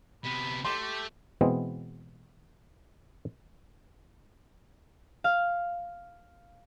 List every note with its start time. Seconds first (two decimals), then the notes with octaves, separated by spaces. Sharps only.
0.24 C3 B3 B5
0.65 A3 G4 C6
0.82 G4
1.41 B2 E3 G#3 B3 C4
5.24 F5